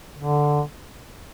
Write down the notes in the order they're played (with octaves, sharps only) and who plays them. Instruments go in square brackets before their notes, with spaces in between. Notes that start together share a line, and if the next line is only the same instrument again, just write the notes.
[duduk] D3